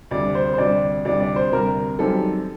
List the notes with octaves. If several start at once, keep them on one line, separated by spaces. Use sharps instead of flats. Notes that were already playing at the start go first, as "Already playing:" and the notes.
D2 C3 G3 D5
C5
C5
D2 C3 G3 D5
D2 C3 G3 D5
D5
C5
D2 C3 G3 A#4
F#2 D#3 G3 C4 A4